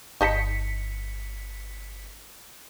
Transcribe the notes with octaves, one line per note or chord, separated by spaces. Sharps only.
G1 D#4 D#5 A5 B6 C#7